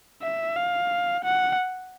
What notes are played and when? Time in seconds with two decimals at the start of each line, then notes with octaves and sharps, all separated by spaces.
0.22 E5
0.56 F5
1.24 F#5